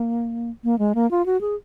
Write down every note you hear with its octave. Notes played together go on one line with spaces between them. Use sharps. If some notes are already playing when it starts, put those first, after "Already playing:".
Already playing: A#3
A#3
G#3
A#3
F4
F#4
G#4